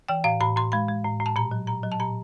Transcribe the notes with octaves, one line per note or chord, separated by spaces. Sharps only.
E3 G5
A2 F5
A2 B5
A2 C6
G#3 B5
G#3
A2
A2
A5
A#2 A#5
F#3
A#2 A#5
F#3
A5
A#2 A#5